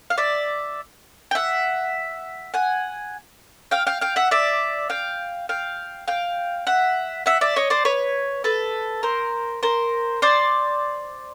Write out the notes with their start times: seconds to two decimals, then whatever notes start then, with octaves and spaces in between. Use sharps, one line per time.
0.10 F5
0.18 D5 E5
1.31 G5
1.35 E5 F#5
2.54 F#5 G#5
3.71 F5 G5
3.87 F5 G5
4.01 F5 G5
4.16 E5 F#5
4.31 D5 E5
4.90 F5 G5
5.49 F5 G5
6.08 F5 G5
6.67 E5 F#5
7.26 E5 F#5
7.41 D5 E5
7.56 C#5 D#5
7.70 C5 D5
7.85 B4 C#5
8.44 A4 B4
9.03 A#4 C5
9.63 A#4 C5
10.22 C5 D5